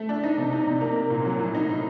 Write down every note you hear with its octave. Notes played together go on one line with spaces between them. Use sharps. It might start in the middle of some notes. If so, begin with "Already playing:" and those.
Already playing: A3
D4
D#4
C3
D#4
C3
A#3
A#3
A#2
F#3
A2
D#4
A2